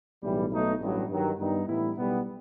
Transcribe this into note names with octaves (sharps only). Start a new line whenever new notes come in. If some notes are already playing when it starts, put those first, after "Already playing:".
B1 A2 E3 G3
B1 B2 A3 D#4
A1 G2 F#3
G2 D#3 F#3
G2 D#3 G3 B3 D#4
A2 E3 G3 B3 E4
B1 B2 G3 B3